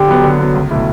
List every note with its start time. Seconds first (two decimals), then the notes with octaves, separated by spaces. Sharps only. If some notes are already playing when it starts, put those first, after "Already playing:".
Already playing: D3 G4
0.08 F#3 B3
0.24 D3
0.39 F#3 B3
0.54 C#2
0.71 B2 F#3 A3 E4